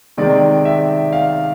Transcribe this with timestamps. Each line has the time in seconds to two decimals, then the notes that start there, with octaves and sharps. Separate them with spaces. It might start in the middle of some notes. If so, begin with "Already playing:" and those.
0.17 C3 D#3 G#3 C4 D5
0.65 E5
1.13 F5